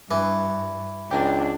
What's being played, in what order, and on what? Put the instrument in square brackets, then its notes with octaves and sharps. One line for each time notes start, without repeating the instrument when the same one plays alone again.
[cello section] G2 [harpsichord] E3 [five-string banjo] B4
[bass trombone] C#2 [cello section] D4 [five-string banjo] G4 A#4 G#5